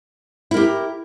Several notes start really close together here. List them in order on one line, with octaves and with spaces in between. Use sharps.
E4 A#4 G4